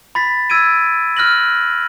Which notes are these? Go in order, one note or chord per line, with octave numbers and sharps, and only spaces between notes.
B5 A6 B6
E6 G#6 D7 D#7
F6 F#6 A#6 F#7